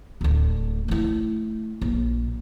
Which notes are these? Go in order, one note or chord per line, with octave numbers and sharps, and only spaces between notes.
D1 D2
A3 E4
A#1